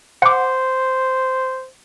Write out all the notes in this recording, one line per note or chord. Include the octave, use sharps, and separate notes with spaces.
C5 F#5 D6